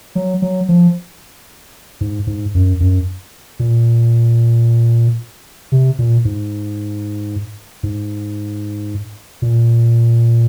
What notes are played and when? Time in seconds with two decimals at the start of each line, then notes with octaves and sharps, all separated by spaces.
0.15 F#3
0.42 F#3
0.69 F3
2.01 G#2
2.27 G#2
2.55 F#2
2.80 F#2
3.59 A#2
5.72 C3
5.99 A#2
6.25 G#2
7.83 G#2
9.42 A#2